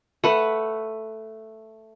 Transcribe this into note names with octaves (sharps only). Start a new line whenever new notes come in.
A3 B4 F#5